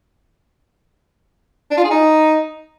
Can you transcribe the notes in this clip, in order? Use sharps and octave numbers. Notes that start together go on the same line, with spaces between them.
D4
F4
G#4
D#4